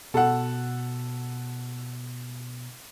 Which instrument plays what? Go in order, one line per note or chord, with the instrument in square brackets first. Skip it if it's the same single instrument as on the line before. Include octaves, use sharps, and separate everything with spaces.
[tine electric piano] B2 [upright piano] A4 F#5